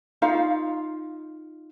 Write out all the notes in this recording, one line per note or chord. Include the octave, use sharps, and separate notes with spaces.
D#4 F4 F5